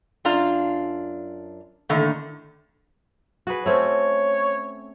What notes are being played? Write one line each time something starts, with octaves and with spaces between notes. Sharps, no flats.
F#2 D4 F4 F5 A#5
A2 D3 D#3 A3 A#3
F#4 G#4 B4
A3 C4 C#4 C#5